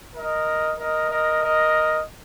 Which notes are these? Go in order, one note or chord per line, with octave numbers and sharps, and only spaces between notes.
A#4 D#5
A#4 D#5
A#4 D#5
A#4 D#5